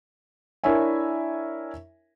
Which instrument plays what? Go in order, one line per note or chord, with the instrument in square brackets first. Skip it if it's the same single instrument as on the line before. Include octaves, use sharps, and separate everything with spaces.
[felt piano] D4 E4 A#4 C#5 E5 G#5